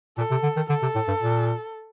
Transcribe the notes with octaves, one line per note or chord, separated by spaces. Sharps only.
A#2 A4
C3
D3
D#3
D3 A4
C3
A2
G2
A#2